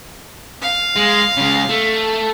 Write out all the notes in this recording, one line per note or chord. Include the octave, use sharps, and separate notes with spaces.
F5
G#3
C#3 G#3
A3